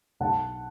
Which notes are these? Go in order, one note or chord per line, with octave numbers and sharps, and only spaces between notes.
B1 F#5 A5